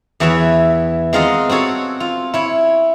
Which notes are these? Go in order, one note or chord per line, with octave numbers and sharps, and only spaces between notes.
E2 E3 E4 B4 C#5 E5
G#3 C4 F4 A#4 D#5 F#5
C4 F#4 A4 C#5
F4
E4 C#5